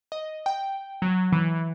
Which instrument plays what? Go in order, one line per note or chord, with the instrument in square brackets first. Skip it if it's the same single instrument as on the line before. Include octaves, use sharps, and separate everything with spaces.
[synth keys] D#5
G5
F#3
E3